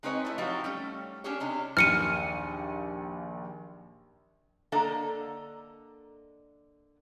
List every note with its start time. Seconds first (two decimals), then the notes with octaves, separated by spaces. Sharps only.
0.03 G#3 C4 D#4 B4 C#5 D#5
0.25 A3 E4
0.38 F3 F#3 C4 D#4 F#4 G4
0.64 G3 A3 C#4
1.24 C#4 D4 G4 G#4 C#5
1.40 C3 D4 D#4
1.77 A#1 D#2 F6 C#7 D#7
4.72 D3 A#3 D4 A4 D#5 A#5